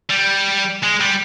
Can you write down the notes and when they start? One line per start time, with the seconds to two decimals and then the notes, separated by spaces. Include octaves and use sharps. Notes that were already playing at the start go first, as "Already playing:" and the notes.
0.10 G3
0.84 G#3
1.01 G3